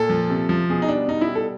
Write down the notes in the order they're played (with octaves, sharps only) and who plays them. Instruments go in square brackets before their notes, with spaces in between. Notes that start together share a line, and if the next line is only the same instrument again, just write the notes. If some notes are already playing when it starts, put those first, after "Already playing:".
Already playing: [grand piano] A#2 A4
F3
C3
F3
B2 G#4
D#4
G3 D4
B2 D#4
E4
G3
A4